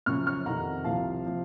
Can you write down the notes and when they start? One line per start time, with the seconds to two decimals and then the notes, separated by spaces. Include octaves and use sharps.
0.06 F#2 C#3 F3 C#6 F6
0.26 C#6 F6
0.45 F2 C3 D#3 F#5 A#5
0.84 C2 C3 F3 F5 A5
1.25 C3 F3